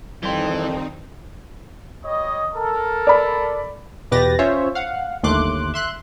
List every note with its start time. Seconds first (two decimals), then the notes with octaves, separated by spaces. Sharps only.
0.23 F2 D#3 E3 G3 C4 D#4 G5 C6
2.05 G3 C#5 D#5
2.55 A4 A#4
3.07 D5 B5
4.11 E2 B2 G4 B4 A6 A#6
4.39 C#4 F4 C5 C#5 E5
4.75 F5 F#5
5.23 G1 D#2 A3 C6 D6 F#6
5.74 E5 C6 F#6